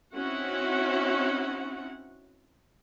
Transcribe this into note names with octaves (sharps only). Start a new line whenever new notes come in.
C4 C#4 D#4 E4 F#4 F#5